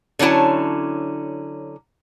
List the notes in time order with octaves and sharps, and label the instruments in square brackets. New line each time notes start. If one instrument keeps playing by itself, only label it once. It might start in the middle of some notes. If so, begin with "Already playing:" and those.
[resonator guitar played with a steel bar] D3 F#3 C#4 E4 A5